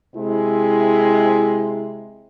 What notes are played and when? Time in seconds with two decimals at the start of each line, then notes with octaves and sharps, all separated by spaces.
0.15 C3 G#3 E4